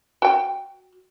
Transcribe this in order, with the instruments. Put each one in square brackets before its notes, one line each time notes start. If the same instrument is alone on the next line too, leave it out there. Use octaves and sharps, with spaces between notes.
[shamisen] F#4 G5